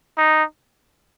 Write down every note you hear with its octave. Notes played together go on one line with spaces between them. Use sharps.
D#4